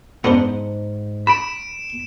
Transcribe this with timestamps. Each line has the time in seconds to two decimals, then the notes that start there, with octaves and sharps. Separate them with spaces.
0.24 G#2 B3 D4 C5
1.27 B5 D7 E7